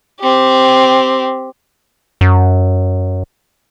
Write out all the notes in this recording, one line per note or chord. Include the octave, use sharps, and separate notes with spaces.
C4 G4
F#2